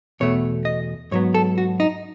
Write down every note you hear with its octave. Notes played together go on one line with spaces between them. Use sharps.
E2 B2 A3 C#5
D#5
G#2 F#3 B3 C#5
A4
F#4
D#4